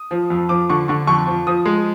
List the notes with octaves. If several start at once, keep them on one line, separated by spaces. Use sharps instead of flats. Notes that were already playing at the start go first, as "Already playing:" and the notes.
Already playing: D#6
F3
F2
F3 D6
D3 C#6
D3 C#6
F2 C#6
F3
F3 D#6
G#3